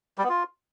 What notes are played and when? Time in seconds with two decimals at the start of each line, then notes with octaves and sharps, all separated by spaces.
0.18 G3
0.24 B3
0.29 F4